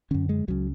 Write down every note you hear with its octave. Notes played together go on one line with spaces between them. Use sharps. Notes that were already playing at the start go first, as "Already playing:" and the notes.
F#2 D3 C#4
G#3
C#2 C#3 F#3